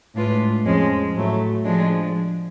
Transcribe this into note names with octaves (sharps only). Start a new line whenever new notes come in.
A2 G#3 D4 F4 B4
F2 F3 G#3 C#4
A2 F#3 A3
F3 G#3 D4